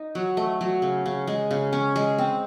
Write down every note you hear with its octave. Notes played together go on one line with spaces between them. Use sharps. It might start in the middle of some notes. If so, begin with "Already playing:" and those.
Already playing: D#4
F#3
A3
F#3
C#3
C#3
G#3
C#3
C#4
G#3
C4